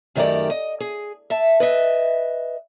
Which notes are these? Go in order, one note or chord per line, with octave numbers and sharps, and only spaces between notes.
F#2 D#3 A3 G4 A#4 D5
D#5
G#4
E5 A5
B4 D#5 E5